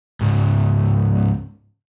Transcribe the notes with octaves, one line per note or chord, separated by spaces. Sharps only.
C#2 G#2